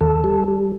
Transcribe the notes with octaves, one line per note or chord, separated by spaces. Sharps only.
D#2 A4
G3
G3